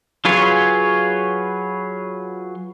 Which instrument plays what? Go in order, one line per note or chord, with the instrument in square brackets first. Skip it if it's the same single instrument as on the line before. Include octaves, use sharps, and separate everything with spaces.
[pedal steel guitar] F#3 F4 G#4 B4 C#5